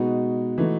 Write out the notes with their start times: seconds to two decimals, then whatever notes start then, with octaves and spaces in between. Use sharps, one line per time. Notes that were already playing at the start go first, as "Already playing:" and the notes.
Already playing: B2 G#3 B3 D#4 F#4
0.58 E3 A3 D#4 F#4